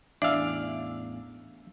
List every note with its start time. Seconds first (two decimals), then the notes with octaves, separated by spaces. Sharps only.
0.22 A1 E2 D4 D5 E5 F5 E6